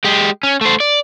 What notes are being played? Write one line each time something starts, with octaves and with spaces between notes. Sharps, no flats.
G#3 G4
C#4
A3 C5
D5